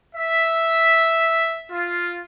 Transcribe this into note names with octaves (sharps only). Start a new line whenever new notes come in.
E5
F4